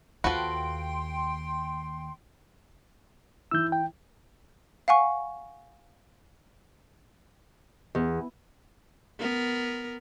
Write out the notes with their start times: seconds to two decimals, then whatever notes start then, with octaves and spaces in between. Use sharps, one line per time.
0.24 D#2 F3 F4 F#4 A4 B4 G5 C6
3.51 E3 E4 E6 G6
3.72 G5
4.88 F5 F#5 G#5 C#6
7.95 E2
9.19 B3 A#4